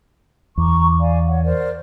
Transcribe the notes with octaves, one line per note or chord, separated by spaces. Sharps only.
E2 A#5 C#6 D6
D5 F5 G#5
C#5 F#5
A#4 C5 D5